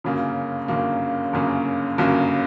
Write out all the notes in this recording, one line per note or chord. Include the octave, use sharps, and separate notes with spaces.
G1 F#2 C#3 F#3 A#3
G1 F#2 C#3 F#3 A#3
G1 F#2 C#3 F#3 A#3
G1 F#2 C#3 F#3 A#3